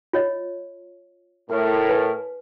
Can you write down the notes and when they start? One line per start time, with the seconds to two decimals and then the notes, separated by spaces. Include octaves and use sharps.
0.13 F4 C#5 D#5
1.50 A2 A#4
1.89 B4 G#5